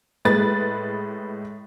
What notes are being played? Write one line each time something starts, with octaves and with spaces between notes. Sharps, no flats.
A2 G#3 B4 A6